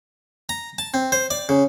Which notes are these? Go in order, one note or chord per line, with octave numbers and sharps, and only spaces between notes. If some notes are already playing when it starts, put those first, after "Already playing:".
A#5
A5
C4
C5
D5
C#3